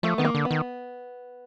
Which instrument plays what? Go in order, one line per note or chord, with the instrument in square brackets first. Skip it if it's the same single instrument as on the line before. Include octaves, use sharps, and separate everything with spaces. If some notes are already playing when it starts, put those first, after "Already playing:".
[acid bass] F3 [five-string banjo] A3
[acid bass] D#3 [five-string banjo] B3
[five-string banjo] A#3
[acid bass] D3
[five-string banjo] B3
[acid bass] D#3